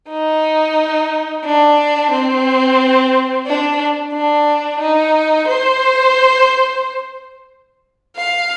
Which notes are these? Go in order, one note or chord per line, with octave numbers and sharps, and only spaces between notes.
D#4
D4
C4
D4
D4
D#4
C5
F5